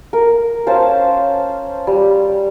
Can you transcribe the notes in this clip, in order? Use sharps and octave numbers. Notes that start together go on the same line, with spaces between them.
A#4
C#4 C5 F5 A5
G3